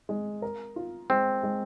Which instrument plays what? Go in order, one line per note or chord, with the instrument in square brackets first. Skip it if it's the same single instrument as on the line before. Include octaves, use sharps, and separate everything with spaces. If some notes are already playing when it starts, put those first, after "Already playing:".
[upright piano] G#3
A#4
F4
[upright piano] G#3 [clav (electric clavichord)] C4
[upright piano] G#3